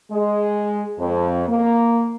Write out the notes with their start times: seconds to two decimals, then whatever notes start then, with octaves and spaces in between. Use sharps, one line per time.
0.12 G#3
0.99 F2
1.49 A#3